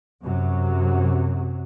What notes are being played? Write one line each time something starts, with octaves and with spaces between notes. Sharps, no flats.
F#2 C3 F#3